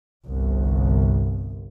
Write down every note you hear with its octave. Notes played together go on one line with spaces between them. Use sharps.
G1 C2